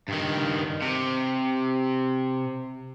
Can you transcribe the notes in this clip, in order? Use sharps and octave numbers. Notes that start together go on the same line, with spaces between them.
G2 D#3
C3